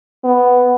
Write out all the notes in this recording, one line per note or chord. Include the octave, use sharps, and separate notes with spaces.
B3